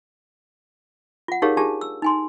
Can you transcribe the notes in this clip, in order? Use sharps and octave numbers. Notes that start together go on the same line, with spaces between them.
F4 F#5
D#4 G4 G#4 A#4 C#5 F5
D4 F4 G4 G#4 A5
E6
D#4 G#5 C6